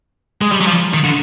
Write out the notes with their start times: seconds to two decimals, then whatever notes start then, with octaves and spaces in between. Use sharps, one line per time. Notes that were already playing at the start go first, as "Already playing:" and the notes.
0.41 G#3
0.52 G3
0.61 F#3
0.67 F3
0.94 D#3
1.04 D3